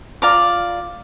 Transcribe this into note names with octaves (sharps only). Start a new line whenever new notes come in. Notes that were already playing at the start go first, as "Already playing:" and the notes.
F4 D5 A#5 D6